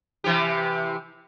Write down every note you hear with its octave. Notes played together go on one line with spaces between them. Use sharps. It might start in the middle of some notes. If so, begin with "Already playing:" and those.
C3 E3 G4